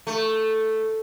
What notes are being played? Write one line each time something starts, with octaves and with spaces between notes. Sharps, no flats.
A3